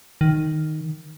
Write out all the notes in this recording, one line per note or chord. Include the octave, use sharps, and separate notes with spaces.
D#3